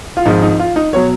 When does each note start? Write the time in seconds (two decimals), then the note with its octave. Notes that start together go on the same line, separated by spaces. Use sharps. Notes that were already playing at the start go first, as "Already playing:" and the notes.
0.17 F4
0.25 G#1 G#2 F3 D#4
0.42 D#4
0.59 F4
0.76 D#4
0.93 B2 F#3 C#5